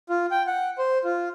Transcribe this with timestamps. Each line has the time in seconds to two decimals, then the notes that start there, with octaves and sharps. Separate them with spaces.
0.09 F4
0.31 G5
0.47 F#5
0.78 C5
1.04 F4